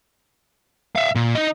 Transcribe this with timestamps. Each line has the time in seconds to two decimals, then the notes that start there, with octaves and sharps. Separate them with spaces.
0.95 E5 F5
1.15 A#2
1.35 D#4 D#5